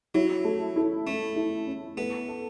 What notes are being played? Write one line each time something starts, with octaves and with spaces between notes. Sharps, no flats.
F#3 E4
A3
E4
A3 C#4
E4
C#4
A3 B3
A4